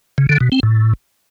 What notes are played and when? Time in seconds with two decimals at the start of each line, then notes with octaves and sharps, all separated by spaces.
0.18 C#3
0.29 D3
0.41 B2
0.52 C4
0.63 A2